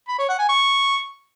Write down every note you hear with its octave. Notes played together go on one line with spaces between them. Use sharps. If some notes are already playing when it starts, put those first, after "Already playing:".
B5
C#5
F#5
G#5
C#6